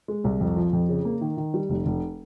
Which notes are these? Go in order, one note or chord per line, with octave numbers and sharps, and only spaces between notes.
G#3
C2
F2
F3
F2
C#3
A#3
D#3
D#3
G3
F1
F1